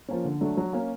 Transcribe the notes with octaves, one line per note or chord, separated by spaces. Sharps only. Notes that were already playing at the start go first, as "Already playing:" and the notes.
F3 A#3 C#4
D3
F#3 A3 D4
F#3
A#3 C#4